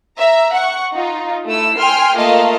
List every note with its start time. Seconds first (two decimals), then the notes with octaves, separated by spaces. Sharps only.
0.19 E5 A#5
0.54 F#5 C#6
0.93 D#4 F4
1.47 A3 E4 E6
1.77 G5 G#5 C6 F6 C7
2.15 A3 A#3 F4 D#5 F5 A5